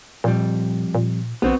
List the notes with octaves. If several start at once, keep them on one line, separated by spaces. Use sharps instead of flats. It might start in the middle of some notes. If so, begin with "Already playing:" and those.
F2 A#2 G3
A#2
A#1 B3 C4 F#4